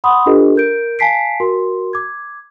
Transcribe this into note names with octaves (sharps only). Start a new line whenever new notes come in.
F#5 B5 C6 D#6
D4 F4 G4 A4 B4 D#5
A#4 G6 D7
F5 G#5 A5 B6 C7 D7
F#4 A#4 C6
D6 G#6